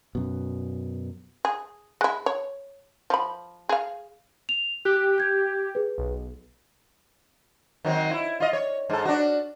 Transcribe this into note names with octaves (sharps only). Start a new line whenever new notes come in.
F#2 B2
G#4
G#3 E4
C#5
F3 B5
G#4 F5
F7
G4 F#6
G6 G#6
G#4 B4
B1
D#3 F#3 C4
E4
F4 D#5
C#5
G#2 A4
D4 F#4